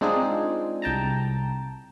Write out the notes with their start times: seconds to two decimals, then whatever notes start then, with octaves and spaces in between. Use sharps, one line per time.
0.01 G#3 C4 D4 D#4 F4 G#4
0.82 C2 G5 A5 A#5